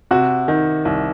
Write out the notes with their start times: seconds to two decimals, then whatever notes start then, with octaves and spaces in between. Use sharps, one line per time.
0.11 C3 F#4
0.48 D#3
0.85 C2